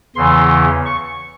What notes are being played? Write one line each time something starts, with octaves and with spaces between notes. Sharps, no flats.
E2 C#3 E3 C6
C#6